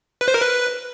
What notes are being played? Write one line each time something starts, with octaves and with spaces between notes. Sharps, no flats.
B4
C5
A#4
B4